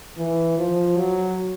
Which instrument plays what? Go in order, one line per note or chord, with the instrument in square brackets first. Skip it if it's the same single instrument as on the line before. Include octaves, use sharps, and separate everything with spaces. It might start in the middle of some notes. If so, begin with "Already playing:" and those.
[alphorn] E3
F3
F#3